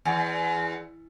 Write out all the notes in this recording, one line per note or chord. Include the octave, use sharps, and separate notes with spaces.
E2